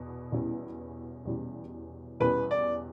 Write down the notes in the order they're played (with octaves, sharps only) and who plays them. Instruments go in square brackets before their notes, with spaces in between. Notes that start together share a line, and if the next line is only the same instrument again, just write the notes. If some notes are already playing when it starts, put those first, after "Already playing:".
Already playing: [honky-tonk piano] E2 B2
E2 B2 G3 C#4 E4
E2 B2 G3 C#4 E4
[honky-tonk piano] E2 B2 G3 C#4 E4 [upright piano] B4
[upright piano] D5